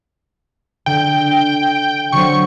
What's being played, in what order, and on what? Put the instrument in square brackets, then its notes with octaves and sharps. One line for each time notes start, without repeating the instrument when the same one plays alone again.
[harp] D3 [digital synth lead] G5
[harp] D3 F#3 C4 [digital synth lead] C#6